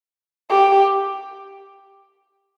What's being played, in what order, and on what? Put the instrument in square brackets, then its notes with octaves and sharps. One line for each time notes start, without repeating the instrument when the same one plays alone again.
[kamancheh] G4